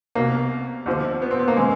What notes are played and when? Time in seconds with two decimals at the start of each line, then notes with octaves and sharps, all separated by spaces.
0.15 C2 B2 A#3
0.86 D#2 D3 F3
1.22 B3
1.31 C4
1.39 B3
1.48 A#3
1.56 C#3 E3 G#3